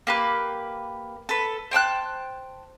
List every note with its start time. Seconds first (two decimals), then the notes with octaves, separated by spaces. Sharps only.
0.07 A#3 G4 B4
1.29 A4 B4
1.71 C5 G5 A5 F#6